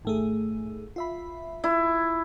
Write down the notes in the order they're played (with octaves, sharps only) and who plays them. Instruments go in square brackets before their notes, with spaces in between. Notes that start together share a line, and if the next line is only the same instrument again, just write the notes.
[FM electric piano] G#1 A3 G#4
F4 E5 B5
[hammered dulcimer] E4